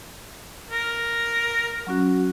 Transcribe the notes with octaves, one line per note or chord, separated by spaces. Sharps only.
A#4
F#3 C#4 F#4